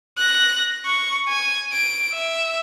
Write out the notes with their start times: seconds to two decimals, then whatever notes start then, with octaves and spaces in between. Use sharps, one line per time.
0.18 F#6 A#6
0.85 C#6
1.28 G#5
1.73 D7
2.13 E5